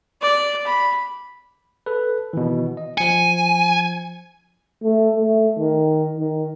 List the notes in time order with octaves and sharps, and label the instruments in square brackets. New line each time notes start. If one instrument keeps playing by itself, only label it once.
[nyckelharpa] D5
B5
[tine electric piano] A4 B4
B2 D#3 E3
D#5
[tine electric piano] F3 C#7 [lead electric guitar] G#5
[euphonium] A3
A3
D#3
D#3